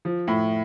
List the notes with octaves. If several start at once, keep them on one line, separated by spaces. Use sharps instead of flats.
F3
A2